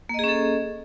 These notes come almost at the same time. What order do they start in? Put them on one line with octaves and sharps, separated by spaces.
A#3 D#5 G#4 C#4 A4